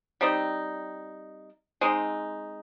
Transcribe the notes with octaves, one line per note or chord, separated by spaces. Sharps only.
G3 C4 D#4
G#3 C4 D#4